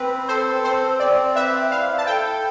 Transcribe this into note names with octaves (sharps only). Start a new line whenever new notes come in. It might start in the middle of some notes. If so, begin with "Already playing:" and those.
Already playing: C4 B4
A4 C5
C4 C5
C4 D5
B4 E5
E4 F5
A5
A4 G5